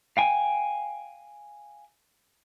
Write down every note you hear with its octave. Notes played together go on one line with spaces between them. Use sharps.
F5 G5 G#5